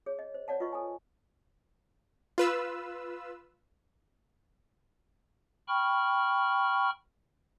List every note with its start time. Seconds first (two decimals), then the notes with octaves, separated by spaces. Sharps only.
0.06 G#4 C#5
0.19 D#5
0.34 C5
0.48 C#5 D5 F#5 A5
0.60 F4 B4 D#5 C#6
0.72 A4 G#5
2.38 F4 B4 E6
5.68 G5 B5 C#6 F6